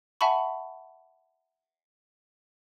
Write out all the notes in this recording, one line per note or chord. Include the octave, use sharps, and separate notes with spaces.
E5 F#5 G#5 A5 B5 C#6